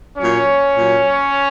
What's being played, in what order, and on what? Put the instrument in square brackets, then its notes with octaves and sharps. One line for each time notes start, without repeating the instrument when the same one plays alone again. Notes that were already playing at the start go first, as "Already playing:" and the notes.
[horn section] A#2 F#3 C#4 C#5
A#2 F#3